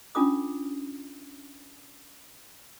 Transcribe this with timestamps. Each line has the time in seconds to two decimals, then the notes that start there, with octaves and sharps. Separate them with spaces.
0.15 C#4 D4 F4 A4 D6 D#6